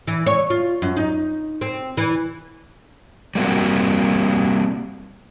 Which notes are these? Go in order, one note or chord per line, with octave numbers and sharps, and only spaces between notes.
E3
C#5
F4
F#2
D#4
C4
E3
G3 A#3 C4 F#4